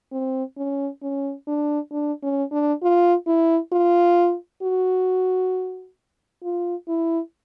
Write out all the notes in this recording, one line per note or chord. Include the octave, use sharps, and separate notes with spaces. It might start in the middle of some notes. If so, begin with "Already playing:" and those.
C4
C#4
C#4
D4
D4
C#4
D4
F4
E4
F4
F#4
F4
E4